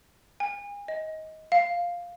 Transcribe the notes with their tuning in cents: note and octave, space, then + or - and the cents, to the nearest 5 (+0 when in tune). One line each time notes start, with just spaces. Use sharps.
G#5 -40
D#5 +20
F5 +0